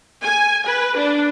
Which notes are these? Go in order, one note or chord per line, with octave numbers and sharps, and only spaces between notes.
G#5
B4
D4